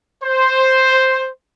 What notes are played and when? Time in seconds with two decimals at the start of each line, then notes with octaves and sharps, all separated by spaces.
0.23 C5